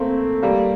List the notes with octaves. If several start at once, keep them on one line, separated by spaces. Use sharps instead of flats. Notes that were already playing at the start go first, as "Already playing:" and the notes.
Already playing: A3 A#3 C4
G3 A#3